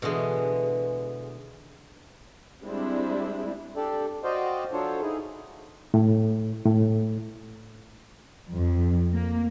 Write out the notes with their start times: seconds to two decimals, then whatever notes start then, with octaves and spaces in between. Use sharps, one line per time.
0.02 B2 D3 E3 G#3
2.62 G3 G#3 C4 D4 E4
3.76 D4 G4 A4 D5
4.24 F#4 C5 D5 D#5 F5 G5
4.73 F#3 D4 F4 A4 C5 C#5
5.02 D#4 E4 G#4
5.94 A2
6.66 A2
8.52 F2
9.12 A#3